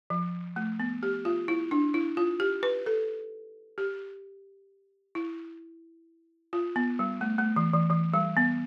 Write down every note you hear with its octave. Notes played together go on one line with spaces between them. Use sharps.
F3
A3
B3
G4
F4
E4
D4
E4
F4
G4
B4
A4
G4
E4
F4
B3
G3
A3
A3
E3
E3
E3
G3
B3